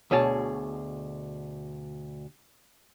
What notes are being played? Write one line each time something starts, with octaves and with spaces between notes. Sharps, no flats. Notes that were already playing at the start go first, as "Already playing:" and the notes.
D2 B2 G#4 C#5 A5